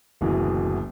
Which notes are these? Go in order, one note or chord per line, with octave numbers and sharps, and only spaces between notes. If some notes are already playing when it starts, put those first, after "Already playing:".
F#1 D2 B2 E3